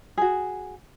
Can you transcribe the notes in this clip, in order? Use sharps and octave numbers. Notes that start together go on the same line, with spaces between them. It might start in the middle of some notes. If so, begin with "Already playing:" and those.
F#4 G#4